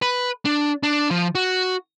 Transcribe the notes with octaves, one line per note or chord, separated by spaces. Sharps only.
B4
D4
D4
F3
F#4